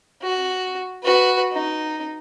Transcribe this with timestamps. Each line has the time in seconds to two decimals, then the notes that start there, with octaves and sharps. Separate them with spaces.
0.22 F#4
1.03 F#4 B4
1.52 D#4